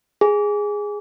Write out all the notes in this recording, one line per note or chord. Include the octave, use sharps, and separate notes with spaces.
G#4